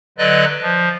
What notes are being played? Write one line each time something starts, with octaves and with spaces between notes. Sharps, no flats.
D3 F#3 B4 D5 D#5 F#6
F3